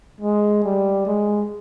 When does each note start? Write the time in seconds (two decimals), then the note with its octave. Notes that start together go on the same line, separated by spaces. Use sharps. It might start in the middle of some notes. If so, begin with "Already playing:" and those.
0.21 G#3
0.64 G3
1.07 G#3